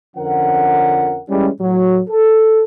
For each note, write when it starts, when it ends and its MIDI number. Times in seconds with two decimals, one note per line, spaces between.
0.17 1.20 41
0.17 1.20 50
0.17 1.20 53
0.17 1.20 61
0.17 1.20 70
0.17 1.20 78
1.29 1.49 52
1.29 1.49 55
1.29 1.49 56
1.29 1.49 61
1.61 2.00 45
1.61 2.00 54
2.09 2.63 69